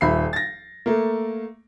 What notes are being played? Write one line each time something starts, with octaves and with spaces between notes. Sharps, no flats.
D#1 E5 B5 C7
A6 A#6
A3 A#3